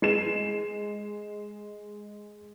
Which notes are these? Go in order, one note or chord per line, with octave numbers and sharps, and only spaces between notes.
G#3 C7 E7